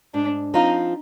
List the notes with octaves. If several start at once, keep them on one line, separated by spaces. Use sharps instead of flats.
G#2 D4
F3 C4 D#4 F4